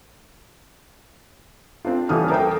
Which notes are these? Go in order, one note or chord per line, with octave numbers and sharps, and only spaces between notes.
C4 D4 F4
D#1 E3 F#5 D#6 F6
A4 A#4 C5 E5 G5